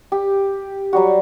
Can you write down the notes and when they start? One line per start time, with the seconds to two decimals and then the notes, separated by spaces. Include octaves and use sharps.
0.12 G4
0.93 F#3 G3 F#4